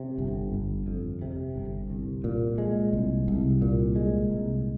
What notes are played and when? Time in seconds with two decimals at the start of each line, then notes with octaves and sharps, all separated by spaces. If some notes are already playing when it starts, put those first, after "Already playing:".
Already playing: C3
0.18 G1
0.53 G1
0.87 F2
1.22 C3
1.56 G1
1.90 C2
2.24 A#2
2.58 G#3
2.93 C2
3.28 C2
3.62 A#2
3.96 G#3
4.30 C2